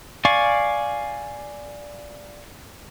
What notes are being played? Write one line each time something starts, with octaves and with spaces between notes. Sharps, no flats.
D5 F5 G#5 C#6 D6